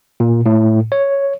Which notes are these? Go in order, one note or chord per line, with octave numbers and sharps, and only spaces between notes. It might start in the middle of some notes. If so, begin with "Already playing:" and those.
A#2
A2
C#5